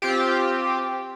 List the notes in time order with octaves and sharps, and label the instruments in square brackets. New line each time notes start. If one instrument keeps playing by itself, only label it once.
[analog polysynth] C4 F4 G4